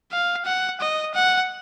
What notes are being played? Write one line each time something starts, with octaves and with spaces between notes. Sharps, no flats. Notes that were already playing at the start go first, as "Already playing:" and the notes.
F5
F#5
D#5
F#5